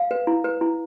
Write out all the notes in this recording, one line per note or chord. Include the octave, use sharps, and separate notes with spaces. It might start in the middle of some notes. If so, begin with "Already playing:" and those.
Already playing: F5
B4
E4
B4
E4